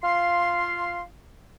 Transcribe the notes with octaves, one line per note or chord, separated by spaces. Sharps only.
F4 F5 C6